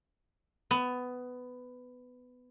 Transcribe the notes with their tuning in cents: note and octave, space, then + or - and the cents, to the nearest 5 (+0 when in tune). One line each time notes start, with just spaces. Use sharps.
B3 +15